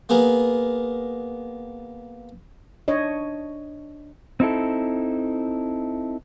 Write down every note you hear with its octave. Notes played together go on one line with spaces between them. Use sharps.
A#3 B3 G#4 A#4
D4 C#5 D#5
C4 D#4 E4 A4